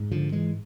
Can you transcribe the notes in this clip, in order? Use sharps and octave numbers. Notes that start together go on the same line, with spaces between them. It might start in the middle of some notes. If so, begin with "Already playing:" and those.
Already playing: G#2
D3 F3
E3 G#3